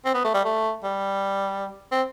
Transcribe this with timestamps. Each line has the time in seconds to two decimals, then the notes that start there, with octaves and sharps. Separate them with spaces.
0.05 C4
0.14 B3
0.24 A3
0.34 G3
0.45 A3
0.84 G3
1.92 C4